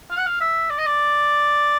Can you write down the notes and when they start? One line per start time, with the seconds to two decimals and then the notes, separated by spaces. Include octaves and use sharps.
0.11 F5
0.18 F#5
0.26 F5
0.41 E5
0.70 D5
0.78 D#5
0.86 D5